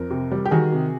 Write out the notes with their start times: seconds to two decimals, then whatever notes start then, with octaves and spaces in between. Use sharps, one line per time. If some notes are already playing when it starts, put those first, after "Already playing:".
Already playing: F2 A#4
0.10 C3
0.31 G3
0.45 G4
0.51 D#3 F#4 G#4
0.72 C3